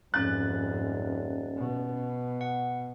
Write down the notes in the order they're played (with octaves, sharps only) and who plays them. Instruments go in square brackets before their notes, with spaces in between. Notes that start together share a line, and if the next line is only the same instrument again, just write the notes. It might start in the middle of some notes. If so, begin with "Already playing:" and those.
[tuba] D#1 [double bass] F2 G#2 [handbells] C#4 A6 [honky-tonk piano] F#6
[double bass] B2
[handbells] F#5